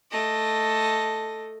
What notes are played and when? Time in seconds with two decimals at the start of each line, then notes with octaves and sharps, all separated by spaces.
0.11 A3 D#5